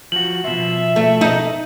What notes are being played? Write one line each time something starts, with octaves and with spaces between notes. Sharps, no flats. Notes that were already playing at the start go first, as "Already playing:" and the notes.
F3 F#4 F#7
B2 F3 E5
A3
D#4 D#5